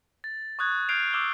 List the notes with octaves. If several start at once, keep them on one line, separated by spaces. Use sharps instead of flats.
A6
C#6 D#6 F#6 G#6
F6 G6 G#6 C7 D7 F7
D6 E6 F6 C7 G7